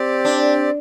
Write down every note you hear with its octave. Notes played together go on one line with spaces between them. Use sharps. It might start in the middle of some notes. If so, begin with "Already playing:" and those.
Already playing: C4 G4 D5
D4